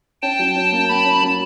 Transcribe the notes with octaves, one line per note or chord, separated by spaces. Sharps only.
C#4 G5 A5
F#3
C#4
A#3
A#3 A5 B5
C#4
F#3